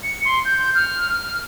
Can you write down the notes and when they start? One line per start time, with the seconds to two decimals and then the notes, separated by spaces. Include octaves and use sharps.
0.03 C#7
0.25 C6
0.45 G6
0.75 F6
1.12 F6